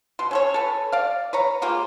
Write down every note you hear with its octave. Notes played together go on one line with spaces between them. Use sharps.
B2 C6
C#4 A4 C#5
A4 B4
D5 F5
B4 C#5 A#5
G#3 A#3 F4 G4